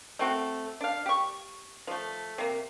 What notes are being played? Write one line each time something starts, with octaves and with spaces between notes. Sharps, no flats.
A3 C4 F#4
D4 F5
G4 C#6
F3 A3
C3 A#3